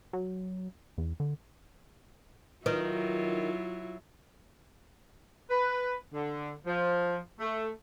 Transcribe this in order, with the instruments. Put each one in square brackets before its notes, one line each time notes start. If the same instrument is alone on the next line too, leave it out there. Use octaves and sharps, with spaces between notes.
[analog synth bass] F#3
E2
D3
[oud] D#3 [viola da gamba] F#3 E4 [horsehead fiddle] F4 [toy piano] B4
[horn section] B4
D3
F3
A3